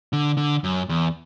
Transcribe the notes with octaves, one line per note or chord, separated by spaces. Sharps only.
D3
D3
F#2
E2